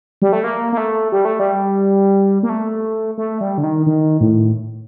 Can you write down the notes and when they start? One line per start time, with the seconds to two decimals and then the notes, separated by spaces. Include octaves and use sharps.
0.22 G3
0.33 A3
0.44 A#3
0.72 A#3
0.77 A3
1.12 G3
1.25 A3
1.39 G3
2.43 A#3
2.49 A3
3.18 A3
3.41 G3
3.58 D3
3.63 D#3
3.86 D#3
4.21 A2